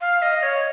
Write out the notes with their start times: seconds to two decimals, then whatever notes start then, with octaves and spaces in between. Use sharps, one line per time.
0.01 F5
0.22 D#5
0.43 C#5